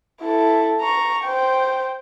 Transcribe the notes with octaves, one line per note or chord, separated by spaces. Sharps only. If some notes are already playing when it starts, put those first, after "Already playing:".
E4 A4
A#5 C#6
C5 G5